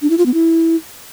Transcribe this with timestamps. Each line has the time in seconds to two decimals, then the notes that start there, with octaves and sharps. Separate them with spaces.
0.02 D4
0.10 E4
0.18 F4
0.26 B3
0.34 E4